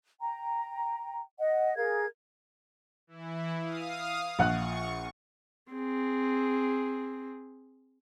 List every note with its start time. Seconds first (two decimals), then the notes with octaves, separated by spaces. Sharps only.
0.20 G5 A#5
1.39 D#5 F#5
1.77 G#4 A#4 F5 G#6
3.07 E3 E4
3.60 F5 D#6
4.39 A#1 F#5 C#6 F#6
5.72 C4 G#4